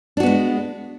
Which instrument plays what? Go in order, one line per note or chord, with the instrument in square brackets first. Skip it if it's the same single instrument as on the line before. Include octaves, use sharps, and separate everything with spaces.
[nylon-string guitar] D4
F#4
B3
G#3